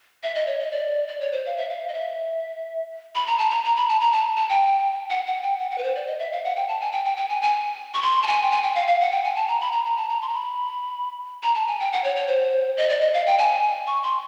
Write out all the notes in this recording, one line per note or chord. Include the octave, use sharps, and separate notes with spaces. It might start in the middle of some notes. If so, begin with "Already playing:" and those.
E5
D#5
C#5
D#5
D5
D5
C#5
C5
F5
E5
F5
D#5
E5
B5
A#5
A5
A#5
A#5
B5
A5
A#5
A5
A5
G5
F#5
F#5
G5
F#5
F#5
B4
C5
D5
D#5
E5
F5
F#5
G5
A5
G#5
G5
G5
G5
G#5
G#5
C#6
C6
A5
G#5
G5
G#5
G5
F5
F5
F#5
G5
G#5
A5
A#5
B5
A#5
A#5
A5
A#5
C6
A#5
B5
A#5
A5
G#5
G5
F#5
C#5
C#5
C5
D#5
D5
D#5
F5
G5
G#5
C#6
C6